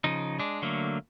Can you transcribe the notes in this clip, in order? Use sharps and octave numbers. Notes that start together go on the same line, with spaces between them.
C#3 F3 D#4
G#3 D4
D3 F#3 A3 A#3